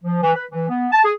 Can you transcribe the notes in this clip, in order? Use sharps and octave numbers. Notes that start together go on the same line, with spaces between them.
F3
E3
B4
E3
B3
A5
G#4